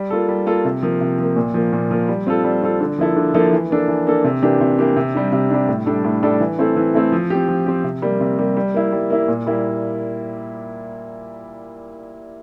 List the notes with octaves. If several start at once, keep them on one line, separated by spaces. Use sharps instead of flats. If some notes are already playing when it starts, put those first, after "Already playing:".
Already playing: G3
A#3 F4 A4
G3
A#3 F4 A4
C3
F3 A#3
C3
F3 A#3
A#2
F3 A#3
A#2
F3 A#3
G3
C4 F4 A4
G3
C4 F4 A4
D3
F3 A#3 E4 A4
D3
F3 A#3 E4 A4
E3
A#3 D4 A4
E3
A#3 D4 A4
C3
E3 A#3 D4 G4
C3
E3 A#3 D4 G4
C3
G3 D4
C3
G3 D4
A2
G3 D4 A4
A2
G3 D4 A4
E3
A3 C4 E4 A4
E3
A3 C4 E4 A4
F3
C4 G4
F3
C4 G4
C3
G3 A#3
C3
G3 A#3
G3
A#3 E4
G3
A#3 E4
A#2
G3 A#3 E4